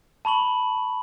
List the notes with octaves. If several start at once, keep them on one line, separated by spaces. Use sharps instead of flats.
A5 B5 C#6 F#7